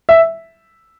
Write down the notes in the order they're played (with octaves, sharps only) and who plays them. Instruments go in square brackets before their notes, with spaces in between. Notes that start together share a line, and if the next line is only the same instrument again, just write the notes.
[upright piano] E5